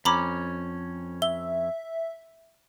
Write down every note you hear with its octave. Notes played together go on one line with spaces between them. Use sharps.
F2 C#4 A#5 B5 D6
E5 G7